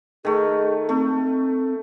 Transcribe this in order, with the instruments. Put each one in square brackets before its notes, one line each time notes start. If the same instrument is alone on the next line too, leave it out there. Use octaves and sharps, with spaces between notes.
[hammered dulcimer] D#3 A3 [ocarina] G#4
[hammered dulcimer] A3 [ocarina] C4